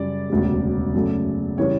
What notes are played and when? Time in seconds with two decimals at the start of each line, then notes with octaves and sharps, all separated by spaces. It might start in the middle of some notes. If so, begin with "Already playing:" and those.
Already playing: F#2 C#3 G3 D5
0.30 E1 D2 C#3 G3
0.93 F#2 C#3 F#3 A3
1.58 C#3 E3 G3 C#5